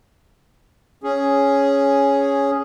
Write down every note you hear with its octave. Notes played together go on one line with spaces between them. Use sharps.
C#4 G#4